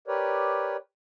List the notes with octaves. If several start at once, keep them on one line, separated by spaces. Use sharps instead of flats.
G4 A#4 B4 C#5 D5